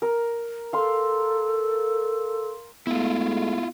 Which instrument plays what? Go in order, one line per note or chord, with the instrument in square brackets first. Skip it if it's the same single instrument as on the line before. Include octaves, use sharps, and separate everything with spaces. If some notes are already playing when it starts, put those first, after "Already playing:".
[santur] A#4
[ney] A4 [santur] F5 C6
[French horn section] G#2 G#3 A3 [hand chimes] B3 [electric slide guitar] E4 F4